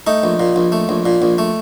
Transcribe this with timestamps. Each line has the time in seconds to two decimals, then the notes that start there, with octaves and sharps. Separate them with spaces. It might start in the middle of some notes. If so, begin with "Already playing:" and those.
0.07 A3 D#4
0.24 A#1
0.40 A#2
0.56 A#1
0.72 A3
0.89 A#1
1.06 A#2
1.22 A#1
1.38 A3